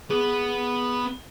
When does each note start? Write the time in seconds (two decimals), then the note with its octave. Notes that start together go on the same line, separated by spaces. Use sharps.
0.10 B3 G#4